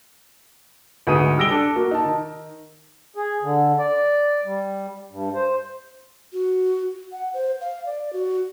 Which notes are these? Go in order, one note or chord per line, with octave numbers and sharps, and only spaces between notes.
D2 G#2 B3 G#4 D#6 D#7
G3 G4 E6 A#6 D7 G7
D4 A4
A#3 F#4
D#4 A5
D#3
G#4
D3
D5
G3
G2
C5
F#4
F#5
C5
F5
D5
F#4